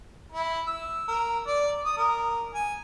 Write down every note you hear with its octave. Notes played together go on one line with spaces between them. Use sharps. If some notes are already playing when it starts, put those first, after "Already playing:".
E4
E6
A#4
D5
D#6
A#4
G#5